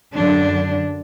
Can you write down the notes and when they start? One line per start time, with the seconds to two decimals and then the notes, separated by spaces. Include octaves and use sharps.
0.16 F#2 D3 D4